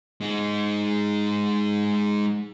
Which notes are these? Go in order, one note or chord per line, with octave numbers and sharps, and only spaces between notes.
G#3 D#4